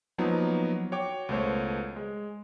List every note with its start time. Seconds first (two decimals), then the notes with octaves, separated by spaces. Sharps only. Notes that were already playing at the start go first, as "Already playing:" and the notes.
0.18 F3 F#3 A#3 B3 D#4 F#4
0.92 F#4 C#5 G5 D6
1.29 C#2 B2 A3 C5 C#5
1.96 G#3